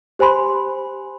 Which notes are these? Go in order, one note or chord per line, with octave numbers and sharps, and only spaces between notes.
G4 C5 G#5 B5 C6